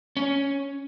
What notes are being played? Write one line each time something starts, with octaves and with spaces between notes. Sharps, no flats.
C#4